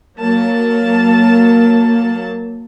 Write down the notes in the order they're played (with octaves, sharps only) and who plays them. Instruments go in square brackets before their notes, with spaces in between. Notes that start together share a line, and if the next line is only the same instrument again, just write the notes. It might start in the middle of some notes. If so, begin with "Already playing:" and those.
[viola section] F#3 A#3 A5